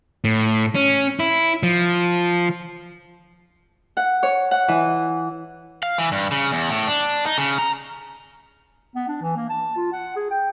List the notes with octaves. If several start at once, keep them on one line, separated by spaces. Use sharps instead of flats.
A2
C#4
E4
F3
F#5
C#5
F#5
E3
F5
E3
G2
C#3
E2
A2
D4
D#4
C#3
A#5
B3
D4
E3
A#3
A5
F4
F#5
G#4
G5